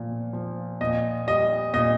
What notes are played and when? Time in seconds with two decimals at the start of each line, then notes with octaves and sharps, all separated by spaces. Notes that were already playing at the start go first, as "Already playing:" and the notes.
Already playing: A#2 F3
0.33 F3
0.81 A#2 D#5
1.27 G3 D#5
1.74 A#2 D#5